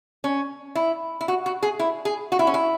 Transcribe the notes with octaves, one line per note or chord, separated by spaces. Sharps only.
C#4
E4
E4
F#4
F#4
G#4
E4
G#4
F#4
E4
C#4
E4